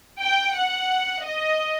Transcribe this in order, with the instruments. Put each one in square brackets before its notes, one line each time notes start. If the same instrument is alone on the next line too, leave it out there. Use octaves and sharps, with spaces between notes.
[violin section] G5
F#5
D#5